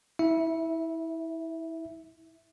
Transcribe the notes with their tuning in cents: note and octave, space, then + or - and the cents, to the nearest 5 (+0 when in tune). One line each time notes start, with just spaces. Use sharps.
E4 -25 E5 +0